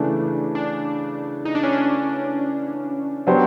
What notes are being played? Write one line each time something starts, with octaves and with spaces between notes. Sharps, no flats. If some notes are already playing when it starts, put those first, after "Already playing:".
Already playing: C#3 E3 A3 D4
D4
D#4
D4
C#4
D4
F#3 B3 D4 G4 C5